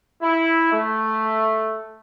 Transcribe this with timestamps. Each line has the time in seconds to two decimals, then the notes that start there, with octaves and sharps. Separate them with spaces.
0.21 E4
0.73 A3